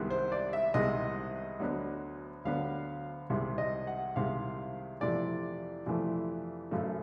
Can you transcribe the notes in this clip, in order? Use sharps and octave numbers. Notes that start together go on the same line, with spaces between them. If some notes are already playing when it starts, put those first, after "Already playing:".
Already playing: C2 C3 D#3 G#3 B3
C5
D5
E5
C2 C3 D#3 G#3 B3 D#5
D2 D3 F#3 B3
D2 D3 F#3 B3 F5
C2 C3 D#3 G#3
D#5
F#5
C2 C3 D#3 G#3 F5
F2 C3 E3 A3 D5
F2 C3 E3 A3
G#1 F#2 C#3 F#3 A3